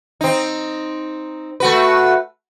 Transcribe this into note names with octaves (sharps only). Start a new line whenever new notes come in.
C4 D#4
A3 F#4 B4